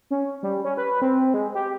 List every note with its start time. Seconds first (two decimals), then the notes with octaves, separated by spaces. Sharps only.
0.11 C#4
0.43 G3
0.65 C#4
0.77 B4
1.02 C4
1.34 G#3
1.55 G4